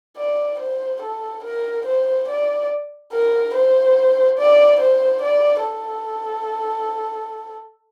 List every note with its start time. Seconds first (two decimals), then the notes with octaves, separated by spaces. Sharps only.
0.17 D5
0.60 C5
1.02 A4
1.44 A#4
1.86 C5
2.28 D5
3.12 A#4
3.55 C5
4.38 D5
4.80 C5
5.22 D5
5.65 A4